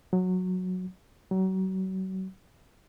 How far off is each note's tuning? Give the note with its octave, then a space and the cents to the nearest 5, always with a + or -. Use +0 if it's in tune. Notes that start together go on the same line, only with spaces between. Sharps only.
F#3 -10
F#3 +35